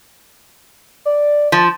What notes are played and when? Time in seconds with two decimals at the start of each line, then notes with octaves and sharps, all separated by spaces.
1.05 D5
1.52 F3